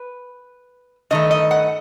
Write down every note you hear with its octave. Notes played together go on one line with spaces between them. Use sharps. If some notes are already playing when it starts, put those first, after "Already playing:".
Already playing: B4
G2 D#3 A3 D#5
D#5
F#5